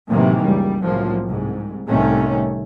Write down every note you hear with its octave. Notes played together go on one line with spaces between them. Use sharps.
A2 C3 D#3 E3 F#3 A#3
C#2 F#2 G3
C2 A2 C#3 F3 F#3 A#3
C2 G#2
C2 A2 C3 D#3 A3 C#4